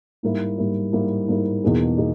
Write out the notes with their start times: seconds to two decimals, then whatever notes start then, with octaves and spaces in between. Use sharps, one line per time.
0.23 G#2 G3 A#3 E4
0.58 G#2 G3 A#3 E4
0.92 G#2 G3 A#3 E4
1.28 G#2 G3 A#3 E4
1.63 E2 B2 A#3 D#4 G#4
1.98 B2 A#3 D#4 G#4